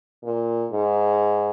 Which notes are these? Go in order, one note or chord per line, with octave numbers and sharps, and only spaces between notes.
A#2
G#2